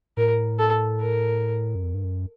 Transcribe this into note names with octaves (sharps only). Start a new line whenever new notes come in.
A2 A#4
A4
A#4
F#2
F2
G2
F#2